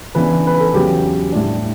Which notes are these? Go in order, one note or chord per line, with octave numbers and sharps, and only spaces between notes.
C#3 E3 B3 D4 B4
B4
A4
E2 C#3 F#3 B3 G4
A2 G3 D4